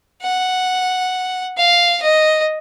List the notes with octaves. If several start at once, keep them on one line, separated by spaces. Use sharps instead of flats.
F#5
F5
D#5